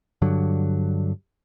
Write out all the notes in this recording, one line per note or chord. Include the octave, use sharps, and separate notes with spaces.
G2 D3 F#3